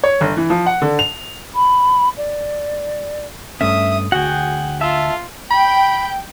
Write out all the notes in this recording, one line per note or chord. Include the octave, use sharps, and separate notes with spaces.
C#5
G1
E3
F3
F#5
D3
F7
B5
D5
G2 A3 C#4 E5 D#6
D2 F#4 G#4 F#5 G5
F4 E5 A5 E6
G5 B5